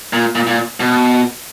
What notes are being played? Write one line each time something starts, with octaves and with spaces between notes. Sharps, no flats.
A#2
A#2
A#2
B2